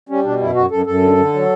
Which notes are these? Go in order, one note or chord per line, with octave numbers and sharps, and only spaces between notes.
G3 C#4
B2 D4
F#2 E4
F#2 F#4
F#2 A4
F#2 A4
D3
D3
F#3